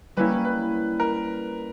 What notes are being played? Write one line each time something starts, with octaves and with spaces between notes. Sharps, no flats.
G3 A#3 C#4 E4 B4
B4
A#4